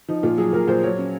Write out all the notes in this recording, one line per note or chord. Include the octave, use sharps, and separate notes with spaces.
F3 D#4
A#2 F4
F#3 G#4
A#2 A#4
A#2 C5
F#3 C#5
C#4